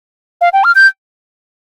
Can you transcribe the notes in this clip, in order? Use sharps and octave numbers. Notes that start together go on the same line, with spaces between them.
F5
G5
F6
G6